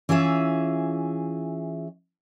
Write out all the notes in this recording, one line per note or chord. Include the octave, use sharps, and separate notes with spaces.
E3 C#4 F4 G#4 E5